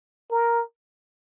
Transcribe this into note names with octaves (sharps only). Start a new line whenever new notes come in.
A#4